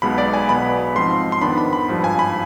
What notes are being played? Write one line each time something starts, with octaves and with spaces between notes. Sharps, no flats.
B1 B2 G#3 B3 B5
D5
G#5
B1 B2 B3 B5
G#2 F3 C4 C6
C6
F2 D#3 B3 D4 B5
B5
B5
G#1 G2 F3
G#5
B5